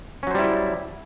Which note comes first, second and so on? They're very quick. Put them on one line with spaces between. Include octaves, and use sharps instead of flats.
C#4 F#3 C5 G3 E4